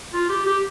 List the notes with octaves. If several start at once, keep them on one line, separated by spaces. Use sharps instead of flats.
F4
G4
G4